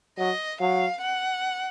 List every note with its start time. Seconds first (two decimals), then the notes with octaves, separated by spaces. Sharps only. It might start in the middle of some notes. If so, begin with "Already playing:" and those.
0.18 F#3 D#5
0.60 F#3 F5
1.02 F#5